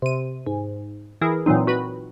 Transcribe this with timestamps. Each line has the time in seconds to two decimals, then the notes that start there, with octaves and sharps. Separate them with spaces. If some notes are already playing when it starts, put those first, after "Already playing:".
0.02 C3 D#7
0.46 G#2
1.21 E3 E4 G#4 A#4
1.46 A#2 E3 F#3 C4 D#4
1.67 F#4 B4 B5